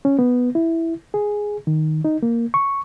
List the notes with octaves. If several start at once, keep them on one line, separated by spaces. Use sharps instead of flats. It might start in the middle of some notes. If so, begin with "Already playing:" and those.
C#4
B3
E4
G#4
D#3
D#4
A#3
C#6